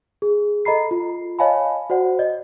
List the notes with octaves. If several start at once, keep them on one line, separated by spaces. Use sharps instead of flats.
G#4
A4 D#5 A#5 B5 C7
F4
C#5 D#5 F5 G#5 A5 B5
F#4 C5 D5 F#5
D5 D#5